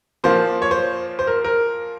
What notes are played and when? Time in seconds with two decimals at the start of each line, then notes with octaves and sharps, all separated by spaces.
0.24 A#2 F3 A#3 C5
0.62 C#5
0.71 C5
1.19 C5
1.27 A#4
1.44 A#4